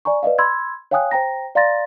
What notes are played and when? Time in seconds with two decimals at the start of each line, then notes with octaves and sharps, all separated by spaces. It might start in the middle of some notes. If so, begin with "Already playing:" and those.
0.05 D5 G#5 A#5 C#6
0.23 B4 D5 D#5 F5
0.39 B5 C6 E6 G#6
0.91 C#5 F5 G5 G#5 D#6 F#6
1.11 C5 G5 A#5 A#6
1.55 D5 F5 A#5 C6 A6 A#6